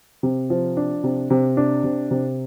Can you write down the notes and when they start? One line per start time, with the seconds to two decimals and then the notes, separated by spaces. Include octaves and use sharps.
0.23 C3
0.50 F3
0.77 D4
1.04 C3
1.30 C3
1.57 D4
1.84 C3
2.11 C3